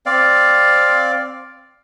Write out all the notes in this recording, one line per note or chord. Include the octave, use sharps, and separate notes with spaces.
C4 D5 F5